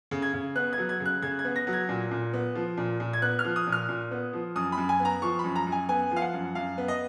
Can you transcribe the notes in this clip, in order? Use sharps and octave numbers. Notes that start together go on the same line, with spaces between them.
C#3
G#6
C#3
B3 F#6
G#6
F#3
G#6
C#3
F#6
C#3 G#6
G#6
B3
A#6
F#3
G#6
A#2
A#2
B3
F3
A#2
A#2
G#6
B3 F#6
F6
F3
D#6
A#2
F6
A#2
B3
F3
F#2 D#6
B5
F#2
G#5
B3
A#5
F3 C#6
B5
F#2
A#5
F#2
G#5
B3 G#5
F3
F5
F#5
F#2
F#2 F5
B3
D#5